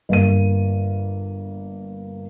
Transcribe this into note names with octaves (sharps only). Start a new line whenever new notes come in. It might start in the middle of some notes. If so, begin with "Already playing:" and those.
G1 A#3 D#7